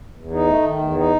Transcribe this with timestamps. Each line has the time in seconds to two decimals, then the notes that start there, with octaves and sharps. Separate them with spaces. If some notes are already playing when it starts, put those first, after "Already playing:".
0.15 E2
0.32 D#4
0.47 A3
0.63 D#3
0.78 E2
0.95 D#4